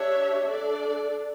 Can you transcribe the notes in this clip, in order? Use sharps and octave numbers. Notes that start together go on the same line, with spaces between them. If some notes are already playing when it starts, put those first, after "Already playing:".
Already playing: D4 G4 C#5 E5
D4 A4 D5